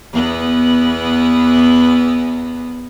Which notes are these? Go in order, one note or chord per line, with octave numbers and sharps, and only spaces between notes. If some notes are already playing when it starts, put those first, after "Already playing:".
E2 B3